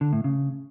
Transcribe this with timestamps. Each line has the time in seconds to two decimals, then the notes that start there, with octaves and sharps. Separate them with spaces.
0.01 D3
0.13 A2
0.24 C#3